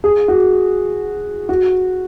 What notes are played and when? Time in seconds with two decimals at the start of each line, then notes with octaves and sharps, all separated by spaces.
0.04 G#4
0.28 F#4
1.49 F#4